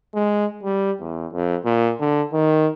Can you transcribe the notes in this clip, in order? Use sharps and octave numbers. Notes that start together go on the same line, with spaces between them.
G#3
G3
E2
F2
A#2
D3
D#3